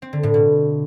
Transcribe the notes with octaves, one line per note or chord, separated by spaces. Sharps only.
C4
D3
A2
B2